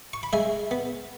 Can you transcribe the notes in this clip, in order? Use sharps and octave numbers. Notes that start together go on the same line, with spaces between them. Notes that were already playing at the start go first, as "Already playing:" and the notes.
C#6
B5
G#3 E5 G#5
B3